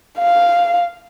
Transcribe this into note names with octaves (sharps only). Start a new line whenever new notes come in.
F5